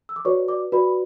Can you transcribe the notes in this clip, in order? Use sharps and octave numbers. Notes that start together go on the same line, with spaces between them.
E6
D6
F#4 B4 C#5 D5 C#6
D5 D6
F#4 B4 D5 B5